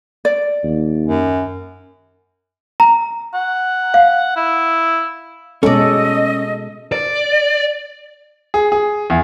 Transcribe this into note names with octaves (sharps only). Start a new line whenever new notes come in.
D5
D#2
F#2
A#5
F#5
F5
E4
B2 G#3 C#4 A4 D5 D#5
D5
G#4
G#4
E2